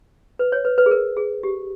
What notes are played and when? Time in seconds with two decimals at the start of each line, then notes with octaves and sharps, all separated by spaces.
0.39 B4
0.52 C#5
0.65 B4
0.78 B4
0.86 G#4
0.91 A#4
1.17 G#4
1.43 G4